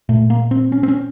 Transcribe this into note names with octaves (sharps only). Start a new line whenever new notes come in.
A#2 A3
A#3
C4
C#4
C4
C#4